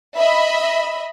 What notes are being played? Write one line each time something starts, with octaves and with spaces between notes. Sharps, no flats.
D#5 E5 B5